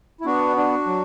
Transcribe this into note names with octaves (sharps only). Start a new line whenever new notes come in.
E4
B3 D4 F#4
D4
F#3